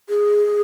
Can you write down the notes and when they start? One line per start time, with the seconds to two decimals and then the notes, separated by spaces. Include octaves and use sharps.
0.09 G#4